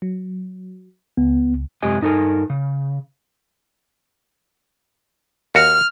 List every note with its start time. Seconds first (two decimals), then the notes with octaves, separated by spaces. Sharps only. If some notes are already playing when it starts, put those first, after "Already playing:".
0.02 F#3
1.17 C#2 B3
1.82 F#2 C3 G#3 G4 D#5 G#5
2.01 G2 D#4 A4 A#4 G#5
2.50 C#3
5.55 D#2 F#4 F6